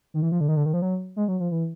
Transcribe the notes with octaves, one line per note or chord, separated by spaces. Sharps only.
D#3
E3
F3
D3
D#3
D3
D#3
F3
F#3
G#3
F#3
F3
E3